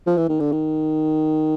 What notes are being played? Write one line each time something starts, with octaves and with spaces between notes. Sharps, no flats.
F3
E3
D#3
D3
D#3